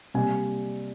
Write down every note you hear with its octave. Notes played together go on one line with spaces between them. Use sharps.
C3 G3 A#3 G#5